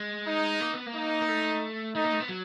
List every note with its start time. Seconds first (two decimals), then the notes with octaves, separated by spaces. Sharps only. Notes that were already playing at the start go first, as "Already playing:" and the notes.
Already playing: G#3
0.27 D#4
0.60 A#3
0.74 B3
0.86 A#3
0.95 D#4
1.22 A#3
1.28 A3
1.95 A3 D#4
2.04 A#3
2.13 A3
2.20 B3
2.29 F#3